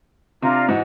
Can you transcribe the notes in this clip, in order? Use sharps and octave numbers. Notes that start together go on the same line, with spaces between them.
C3 D4 F4 A#5
G#2 E3 F#4